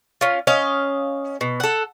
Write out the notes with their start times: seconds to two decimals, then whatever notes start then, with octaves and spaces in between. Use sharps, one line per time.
0.21 C#4 F4
0.47 C#4 D#5 F5
1.41 B2
1.60 A4 F#5